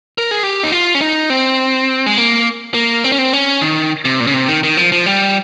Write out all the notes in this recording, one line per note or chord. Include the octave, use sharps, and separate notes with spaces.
A#4
G#4
G4
D#4
F4
C#4
D#4
C4
G#3
A#3
A#3
C4
C#4
C4
C#4
D#3
C3
A#2
C#3
C3
D#3
D#3
F3
F3
G3